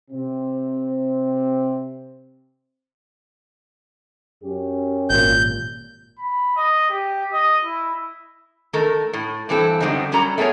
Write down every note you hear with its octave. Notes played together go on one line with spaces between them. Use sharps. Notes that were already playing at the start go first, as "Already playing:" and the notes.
C3 C4
F#2 C#4 G4
G#1 A#2 G6
B5
D#5
G4
D#5
E4
D#3 A3 A4 A#4
A2
G2 E3 C4 A4
F#2 D3 G3 G#3 C4 D#4
F#3 G3 C#4 A4 A#5
A3 B3 G#4 A#4 C#5